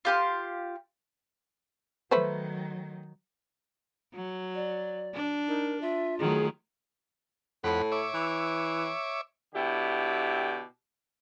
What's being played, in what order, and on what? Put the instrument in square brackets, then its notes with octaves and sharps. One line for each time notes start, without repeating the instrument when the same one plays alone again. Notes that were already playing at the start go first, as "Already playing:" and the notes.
[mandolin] F4 G4 C6
[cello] D#3 F#3 [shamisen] A3 B4 C5
[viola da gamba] F#3
[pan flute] D5
[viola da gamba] D4
[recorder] D#4 [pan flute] A#4
[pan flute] F4 [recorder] E5
[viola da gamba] D#3 F#3 A3 [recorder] G#4
[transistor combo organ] F2 F#5 B5 [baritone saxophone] A2
[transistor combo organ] C#5 E5 D6
[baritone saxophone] E3
[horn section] B2 D3 E4 G4